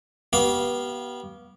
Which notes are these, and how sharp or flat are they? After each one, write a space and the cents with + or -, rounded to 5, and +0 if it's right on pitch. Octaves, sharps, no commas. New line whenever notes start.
B3 -30 G4 -30 F5 -5